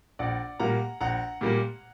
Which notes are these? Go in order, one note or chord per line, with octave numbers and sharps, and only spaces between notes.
A#1 D5 F#5
A#2 G3 A#3 F#5 A#5
A#1 F#5 A#5
A#2 G3 A#3